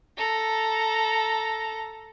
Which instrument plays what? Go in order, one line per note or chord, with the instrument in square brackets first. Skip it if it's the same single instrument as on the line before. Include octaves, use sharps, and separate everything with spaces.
[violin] A4 A#5